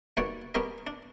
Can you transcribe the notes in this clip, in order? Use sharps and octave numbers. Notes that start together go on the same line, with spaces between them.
D#2 B2 G3 C#5 D5 F#5
G3 B3 C#4 G4 A#4 D#5
D4